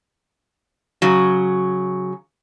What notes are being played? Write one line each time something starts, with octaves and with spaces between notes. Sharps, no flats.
C#3 F#3